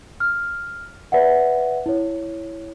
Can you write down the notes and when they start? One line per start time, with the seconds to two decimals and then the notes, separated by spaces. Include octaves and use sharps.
0.20 F6
1.12 B4 D5 E5 F#5
1.86 E4 C#5